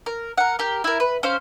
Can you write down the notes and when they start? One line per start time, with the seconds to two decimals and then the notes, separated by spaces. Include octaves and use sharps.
0.06 A#4
0.37 A#4 F#5
0.59 G4 A#4
0.84 E4 A#4
1.00 B4
1.23 C#4 C5 F5